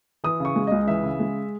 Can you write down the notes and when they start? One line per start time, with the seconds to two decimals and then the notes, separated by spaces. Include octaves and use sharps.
0.24 E3 D#6
0.40 C#3 C#6
0.56 G#3
0.67 C#2 D#5
0.88 E3 E5
1.03 C#3
1.20 G#3